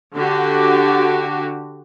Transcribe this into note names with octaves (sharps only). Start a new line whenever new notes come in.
D3 F#4 G4